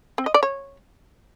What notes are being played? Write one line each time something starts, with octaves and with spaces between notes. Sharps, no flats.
C4
D#5
D5
C#5